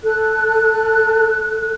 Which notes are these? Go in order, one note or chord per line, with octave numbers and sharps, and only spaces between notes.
A4 F#6